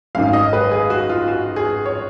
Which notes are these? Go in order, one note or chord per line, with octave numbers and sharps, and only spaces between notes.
G#1 F#2 D#3 F5
D#5
B4
G#4
F#4
F4
F#4
G#4
C#5